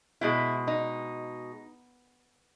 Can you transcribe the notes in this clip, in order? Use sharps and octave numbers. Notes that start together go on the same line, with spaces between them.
B2 G#3 E4
D#4